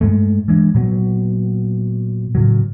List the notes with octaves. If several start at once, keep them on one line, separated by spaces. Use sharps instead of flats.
G2 G#3 A3
E3 G#3 D4
A#2 F#3 B3
A2 C#3 F#3